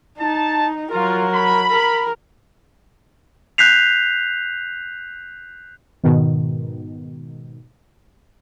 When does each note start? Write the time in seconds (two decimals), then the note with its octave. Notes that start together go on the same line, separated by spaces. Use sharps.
0.19 D#4 A5
0.92 F#3 F4 A#4
1.34 B5
1.70 A#4
3.58 F#6 G6 B6 C7 F7
6.04 G#2 B2 D#3